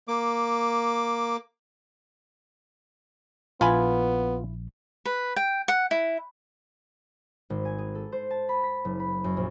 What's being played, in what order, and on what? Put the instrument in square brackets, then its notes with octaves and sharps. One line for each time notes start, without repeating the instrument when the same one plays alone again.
[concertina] A#3 D6
[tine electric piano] A#1 [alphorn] B3 [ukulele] E4 G#5 B5 [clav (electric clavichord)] F4
[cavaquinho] B4
G5
F#5
E4
[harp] G#1
G#5
G#4
A4
C5
A5
B5
B6
F#1
B5
F#2
A#1